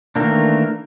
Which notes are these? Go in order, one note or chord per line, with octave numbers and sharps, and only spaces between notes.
D#3 E3 A3 A#3 D4